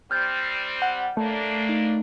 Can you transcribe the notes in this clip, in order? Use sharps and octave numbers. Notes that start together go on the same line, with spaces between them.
G3 C4 F6 G6 A6
F#5
A2 A3 A#3 D4 E5
D#4